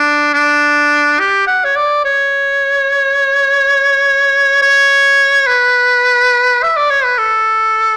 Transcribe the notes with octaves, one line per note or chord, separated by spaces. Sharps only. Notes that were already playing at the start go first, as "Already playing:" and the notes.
Already playing: D4
D4
G4
F#5
C#5
D5
C#5
C#5
B4
E5
D5
C#5
B4
A4